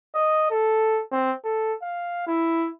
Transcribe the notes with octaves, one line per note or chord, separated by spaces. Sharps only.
D#5
A4
C4
A4
F5
E4